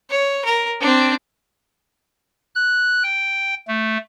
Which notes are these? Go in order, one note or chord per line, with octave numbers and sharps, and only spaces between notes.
C#5
A#4
C4 D4
F#6
G5
A3